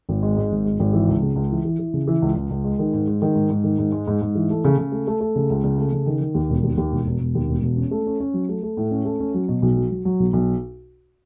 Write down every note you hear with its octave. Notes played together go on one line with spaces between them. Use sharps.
G#1
G#3
G#2
G#1
G#3
G#1
E3
C#2
C#3
C#2
E3
E3
E3
C#3
E3
C#2
C#2
C#2
G#3
D#3
G#2
G#3
D#3
G#2
G#2
D#3
G#2
G#3
G#2
G#2
E3
A3
C#3
C#3
A3
A3
A3
C#3
C#2
C#3
A3
C#3
D#3
D#3
D#2
E1
D#2
D#2
E1
E1
E1
D#2
E1
E1
C#4
A3
C#4
C#4
F#3
A3
A3
A2
C#4
A3
C#4
F#3
B2
B1
F#3
F#3
F#3
B1
B1